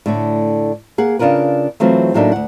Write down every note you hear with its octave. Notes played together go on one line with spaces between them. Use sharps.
A2 D3 A3
A#3 G#4 F#5
C#3 D4 F4 A#4 B4
E3 F#3 A3 C4 F4
A2 F#3 A3 A#3 D4 D#4
D2 F#5